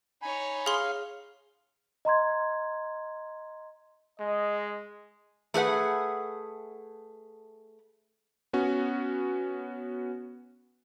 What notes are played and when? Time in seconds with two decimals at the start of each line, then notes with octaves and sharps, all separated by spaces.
0.22 D#4 C#5 G#5 B5
0.66 G#4 F5 C6
2.05 D#5 A#5 C6 G#6
4.20 G#3 D#5
5.54 A3 G#4 B4 F#5
8.53 B3 C#4 F#4